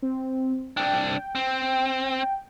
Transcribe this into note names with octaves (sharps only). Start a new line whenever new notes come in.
C4
C2 D4 G5
C4